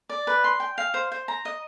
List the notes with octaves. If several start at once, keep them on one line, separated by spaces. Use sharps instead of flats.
D5
B4
C6
G5
F5
C5
C5
A#5
D#5